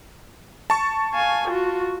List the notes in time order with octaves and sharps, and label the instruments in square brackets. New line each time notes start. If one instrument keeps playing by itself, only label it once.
[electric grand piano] A5 C#6
[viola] F5 G#5
F4 F#4